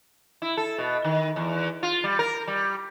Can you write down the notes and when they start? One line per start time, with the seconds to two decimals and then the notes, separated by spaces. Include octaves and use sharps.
0.42 E4
0.57 A4
0.78 B2
1.04 D#3
1.36 E2
1.83 F4
2.04 G3
2.19 A#4
2.47 G3